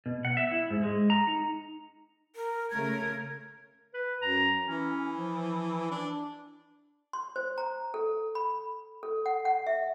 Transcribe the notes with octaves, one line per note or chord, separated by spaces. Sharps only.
B2
F#5
E5
E4
G#2
G#3
A#5
D#4
A#4
C#3 A3 A#4 G#6
B4
F#2 A#5
E3 C#4
F3
D4
C6
C5
A#5
A4
B5
A4
F#5
F#5
E5